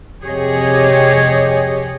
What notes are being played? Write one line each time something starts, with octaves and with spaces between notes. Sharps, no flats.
F2 C3 G4 G#4 C#5 D#5